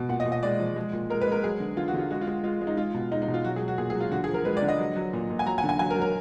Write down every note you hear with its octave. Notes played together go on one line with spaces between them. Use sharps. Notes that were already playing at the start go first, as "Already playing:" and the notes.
Already playing: B2
A#2 F#5
D#5
A#2
D#5
G#3 D5
F3
G#3
A#2
G#3 A#4
B4
G#3 A#4
F#3 G#4
D3
D3 F4
F#4
D3 F4
G#3 F#4
F4
G#3
G#3 F4
G#3
D#4
G#3 F4
B2
G#3 D#4
D#4
B2
F4
F#3 F#4
G#4
F#3
F#4
A#2 G#4
G#4
F#3
F4
D3 F#4
G#4
F3
A#4
G#3 B4
D5
D3
D#5
F#3
F#3
A#2
A#2
G#5
F#3 A#5
G#5
D3
G#5
F#3 G#5
A#4
F#3
A#4